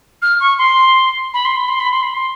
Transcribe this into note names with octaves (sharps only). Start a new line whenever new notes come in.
F6
C#6
C6
B5
C6
B5
C6
B5
C6
B5
C6